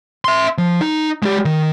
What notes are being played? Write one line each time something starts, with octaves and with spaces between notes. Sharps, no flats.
E5 C6
F3
D#4
G#3 G4
D#3